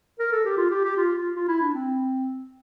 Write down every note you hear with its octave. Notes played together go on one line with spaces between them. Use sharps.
A#4
A4
G4
F4
G4
G4
F4
F4
F4
E4
D4
C4